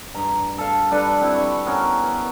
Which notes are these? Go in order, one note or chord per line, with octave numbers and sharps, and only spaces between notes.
G2 A#5
A4 F5
G3 D4 A4 B4
C4 E4
B5 C#6
B3 C#4 A#4